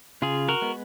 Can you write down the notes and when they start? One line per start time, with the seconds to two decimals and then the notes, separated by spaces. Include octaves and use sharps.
0.22 C#3 F4 G#4
0.48 F#4 A#4
0.62 G#3 B3